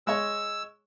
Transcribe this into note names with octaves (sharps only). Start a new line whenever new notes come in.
G#3 C#5 E6